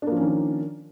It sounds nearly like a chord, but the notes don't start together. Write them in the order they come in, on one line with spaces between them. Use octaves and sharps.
D4 A#3 F3 C#4 D#3